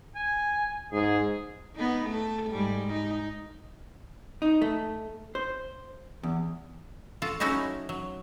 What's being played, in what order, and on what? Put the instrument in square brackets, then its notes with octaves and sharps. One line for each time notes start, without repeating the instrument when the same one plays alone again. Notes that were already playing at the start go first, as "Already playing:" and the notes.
[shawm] G#5
[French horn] G#2 [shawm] G#4
[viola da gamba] B3 D#4
A3 A4
G#2 G3
D#4
[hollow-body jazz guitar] D#4
A3
C5
E2
[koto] F4 F#4 A4
F#3 A3 C#4 D#4 E4 F#4
F#3